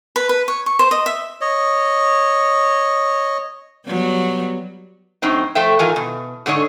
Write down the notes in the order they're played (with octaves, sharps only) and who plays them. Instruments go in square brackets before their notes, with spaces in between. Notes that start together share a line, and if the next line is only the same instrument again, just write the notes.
[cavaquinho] B4
B4
C#5
C#6
C5
D#5
E5
[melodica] C#5 D#5
[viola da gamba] F#3 G3 B3
[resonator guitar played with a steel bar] F#2 A2 C4 D#4
F3 A3 C5 E5 G5
G#2 D#3 E3 F4 A#4 G#5
B2
G#2 D3 D4 C#5 D#5